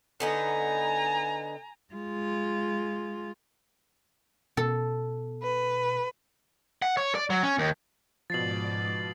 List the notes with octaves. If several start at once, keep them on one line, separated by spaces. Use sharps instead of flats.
D3 B3 D#4 G#5 A#5
G#3 F4
B2 A4
B4
F#5
C#5
D5
F#3
C#4
D#2
G#2 B2 F3 D5 A6 C7 F#7